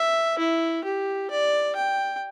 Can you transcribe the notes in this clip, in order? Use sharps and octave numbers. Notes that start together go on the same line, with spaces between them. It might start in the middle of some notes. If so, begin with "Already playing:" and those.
Already playing: E5
E4
G4
D5
G5